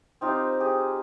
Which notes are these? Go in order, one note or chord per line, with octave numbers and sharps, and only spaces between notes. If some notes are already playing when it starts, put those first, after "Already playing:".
C4 D#4 F4 G4
G4 G#4